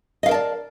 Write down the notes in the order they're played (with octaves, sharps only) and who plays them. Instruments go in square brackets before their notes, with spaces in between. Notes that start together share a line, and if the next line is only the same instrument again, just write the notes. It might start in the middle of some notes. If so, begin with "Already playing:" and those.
[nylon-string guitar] D#5
F5
A#4
A5
D5